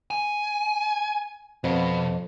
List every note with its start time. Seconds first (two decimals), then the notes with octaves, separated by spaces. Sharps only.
0.11 G#5
1.64 F2 B2